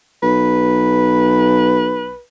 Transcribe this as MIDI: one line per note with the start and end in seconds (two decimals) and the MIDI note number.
0.23 2.16 35
0.23 2.20 71